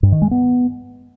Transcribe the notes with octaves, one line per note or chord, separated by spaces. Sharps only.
G2
D#3
G#3
B3